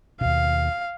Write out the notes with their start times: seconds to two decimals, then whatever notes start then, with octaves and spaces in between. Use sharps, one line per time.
0.21 D#2 B2 F5